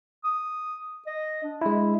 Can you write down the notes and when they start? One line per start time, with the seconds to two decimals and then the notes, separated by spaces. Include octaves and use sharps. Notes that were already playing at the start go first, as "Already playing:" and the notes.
0.24 D#6
1.07 D#5
1.43 D4
1.61 G#3 E4